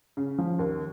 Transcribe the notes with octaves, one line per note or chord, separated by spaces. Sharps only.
C#3
F3
D#2